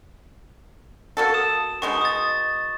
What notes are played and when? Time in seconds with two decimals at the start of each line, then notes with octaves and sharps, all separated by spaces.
1.17 A#3 F#4 A4
1.34 D#6 E7
1.82 B2 G#3 D#4 C#6
2.01 D#6 A6